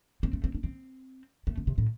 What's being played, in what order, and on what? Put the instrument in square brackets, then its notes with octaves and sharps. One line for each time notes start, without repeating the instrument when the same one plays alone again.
[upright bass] C4
A3
C4
D4
C4
A3
D3
C3
A2